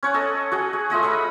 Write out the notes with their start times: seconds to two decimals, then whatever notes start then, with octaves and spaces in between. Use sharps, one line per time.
0.03 C#4 C#5 F#5
0.14 A4 D#5
0.52 F#4 G#4 F#5
0.73 G#4
0.90 A3 F4 D#5 F#5
1.03 E5 F#5 B5